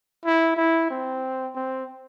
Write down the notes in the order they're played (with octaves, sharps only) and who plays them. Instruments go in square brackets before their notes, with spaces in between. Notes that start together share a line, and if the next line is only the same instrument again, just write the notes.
[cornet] E4
E4
C4
C4